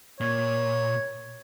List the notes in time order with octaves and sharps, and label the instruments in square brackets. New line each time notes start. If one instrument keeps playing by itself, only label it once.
[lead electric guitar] A#2 [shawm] C#5